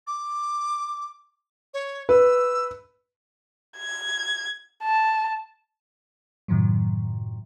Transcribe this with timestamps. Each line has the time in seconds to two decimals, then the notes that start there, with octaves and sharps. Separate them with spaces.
0.07 D6
1.74 C#5
2.09 B4 E6
3.78 G#6
4.83 A5
6.48 F#2 A2 C3 D#3 F3 F#3